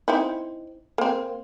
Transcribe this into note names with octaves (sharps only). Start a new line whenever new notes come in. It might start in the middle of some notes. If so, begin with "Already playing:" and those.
C4 D#4 E4
A#3 C4